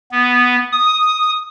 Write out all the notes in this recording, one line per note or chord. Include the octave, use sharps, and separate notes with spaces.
B3
D#6